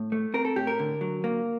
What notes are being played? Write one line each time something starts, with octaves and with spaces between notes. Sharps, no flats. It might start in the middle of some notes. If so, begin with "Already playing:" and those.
Already playing: A2
A3
C4 A#4
A4
A2 G4
A#4
D3
F#3
A#3